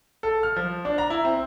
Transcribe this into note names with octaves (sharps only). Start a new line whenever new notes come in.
A4
F6
F3
D4
A#5
E4
C4